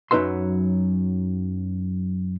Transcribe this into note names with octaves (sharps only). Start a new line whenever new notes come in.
F#2 F#3 D#4 B4 E5 C6